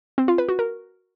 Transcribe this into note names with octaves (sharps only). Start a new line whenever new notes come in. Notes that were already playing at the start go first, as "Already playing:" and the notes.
C4
F4
B4
F#4
A#4